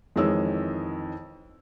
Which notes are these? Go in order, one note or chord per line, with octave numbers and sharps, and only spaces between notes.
F2 D#3 E3 G#3 C#5 E6